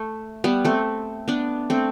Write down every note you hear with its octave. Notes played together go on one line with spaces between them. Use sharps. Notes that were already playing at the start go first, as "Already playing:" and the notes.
Already playing: A3
G3 B3
A3 C4
B3 D4
A3 C4